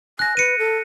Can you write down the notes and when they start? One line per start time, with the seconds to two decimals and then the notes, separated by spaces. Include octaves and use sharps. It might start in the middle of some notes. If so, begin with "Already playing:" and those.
0.19 G#5 F#6 A#6
0.37 B4 C#7 D#7
0.59 A4